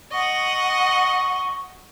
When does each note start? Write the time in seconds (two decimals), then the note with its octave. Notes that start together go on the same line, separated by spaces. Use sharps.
0.12 D#5 F#5 C#6